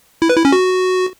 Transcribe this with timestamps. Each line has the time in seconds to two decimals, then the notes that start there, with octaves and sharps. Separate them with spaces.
0.22 E4
0.30 B4
0.37 E4
0.45 C#4
0.52 F#4